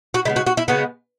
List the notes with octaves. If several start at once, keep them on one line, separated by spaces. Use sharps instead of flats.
F#4
C#3 G#3 B3 E4
F#4
F#4
E4
C#3 G#3 B3 F#4